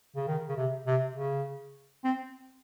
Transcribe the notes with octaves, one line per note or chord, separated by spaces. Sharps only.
C#3
D#3
C#3
C3
C3
C#3
C4